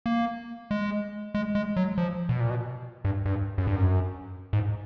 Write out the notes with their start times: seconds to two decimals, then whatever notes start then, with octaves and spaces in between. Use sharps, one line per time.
0.06 A#3
0.71 G#3
1.35 G#3
1.55 G#3
1.76 F#3
1.98 F3
2.29 B2
2.40 A#2
2.50 B2
3.05 G2
3.25 G2
3.58 F#2
3.67 G2
3.76 F#2
4.53 G#2